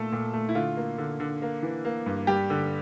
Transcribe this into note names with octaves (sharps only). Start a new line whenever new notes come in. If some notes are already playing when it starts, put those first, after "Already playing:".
Already playing: A#2 A3 A4
A#2
A3
E4
D3 F4
A#3
D3
D3
A#3
E3
A#3
G2
G3 G4
D3